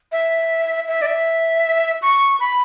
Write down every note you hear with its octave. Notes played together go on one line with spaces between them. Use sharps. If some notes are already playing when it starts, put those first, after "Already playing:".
E5
E5
D5
E5
C#6
B5